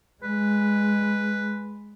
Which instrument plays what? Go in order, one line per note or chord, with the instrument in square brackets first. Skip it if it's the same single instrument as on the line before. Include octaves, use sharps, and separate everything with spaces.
[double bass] G#3 [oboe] B4